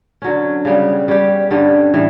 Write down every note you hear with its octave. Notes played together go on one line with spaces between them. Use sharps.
D3 F#3 C#4
C#3 G3 B3
G3 C#4 G4
G2 D3 G3 C#4
A2 E3 G3